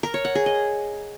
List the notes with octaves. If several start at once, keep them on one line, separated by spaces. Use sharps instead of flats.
A#4
C#5
F#5
G#4
D#5